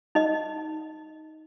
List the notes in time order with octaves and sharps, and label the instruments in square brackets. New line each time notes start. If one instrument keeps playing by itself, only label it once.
[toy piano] D#4 D#5